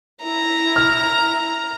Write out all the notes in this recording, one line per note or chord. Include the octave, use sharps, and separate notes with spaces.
E4 A#5
F6